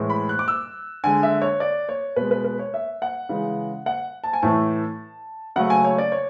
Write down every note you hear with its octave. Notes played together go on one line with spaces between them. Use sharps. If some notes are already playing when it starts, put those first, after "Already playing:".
Already playing: A2 E3 G#3
B5
F#6
D6
E6
D3 G#3 G#5
E5
C#5
D5
C#5
B2 G#3 B4
B4
B4
C#5
E5
F#5
C#3 E3 G#3
F#5
A5
G#5
A2 E3 A3 A5
C#3 F#3 A3 F#5
G#5
C#5
D5
C#5